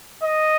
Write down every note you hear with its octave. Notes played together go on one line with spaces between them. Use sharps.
D#5